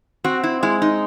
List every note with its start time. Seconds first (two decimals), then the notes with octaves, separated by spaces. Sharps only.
0.24 C4 F#4
0.44 E4
0.63 G#3 E4
0.82 D#4